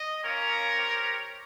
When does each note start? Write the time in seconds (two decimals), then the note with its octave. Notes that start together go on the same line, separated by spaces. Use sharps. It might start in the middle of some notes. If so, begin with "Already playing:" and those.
Already playing: D#5
0.23 A#3 C#4 F4 A#4 C#5
0.70 C4 G4